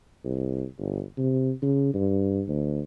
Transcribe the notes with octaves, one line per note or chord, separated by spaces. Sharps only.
C2
G1
C3
C#3
G2
D2